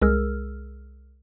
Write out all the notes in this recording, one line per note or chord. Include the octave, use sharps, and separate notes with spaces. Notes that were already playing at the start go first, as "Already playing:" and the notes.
C2 G#3 G#4 A#4 E6 F6